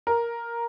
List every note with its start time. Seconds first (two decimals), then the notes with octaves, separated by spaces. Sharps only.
0.07 A#4